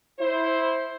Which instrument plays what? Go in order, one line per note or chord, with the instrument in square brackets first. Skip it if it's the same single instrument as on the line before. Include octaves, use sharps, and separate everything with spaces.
[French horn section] E4 C5